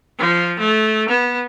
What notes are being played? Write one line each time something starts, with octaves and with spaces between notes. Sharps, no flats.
F3
A3
B3